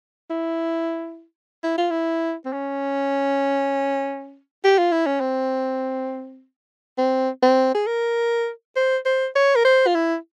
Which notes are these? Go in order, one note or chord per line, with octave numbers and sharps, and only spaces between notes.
E4
E4
F4
E4
C4
C#4
G4
F4
E4
C#4
C4
C4
C4
G#4
A#4
C5
C5
C#5
A#4
C5
F4
E4